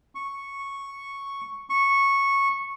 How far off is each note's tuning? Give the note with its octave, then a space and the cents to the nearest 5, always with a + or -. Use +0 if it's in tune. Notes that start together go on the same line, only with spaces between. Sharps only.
C#6 -5
C#6 -10